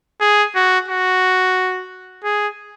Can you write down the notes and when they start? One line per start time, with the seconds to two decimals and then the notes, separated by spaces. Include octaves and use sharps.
0.21 G#4
0.55 F#4
0.88 F#4
2.24 G#4